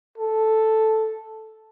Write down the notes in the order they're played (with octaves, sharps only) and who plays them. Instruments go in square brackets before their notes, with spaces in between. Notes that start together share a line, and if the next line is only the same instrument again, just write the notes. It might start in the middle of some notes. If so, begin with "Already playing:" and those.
[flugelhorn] A4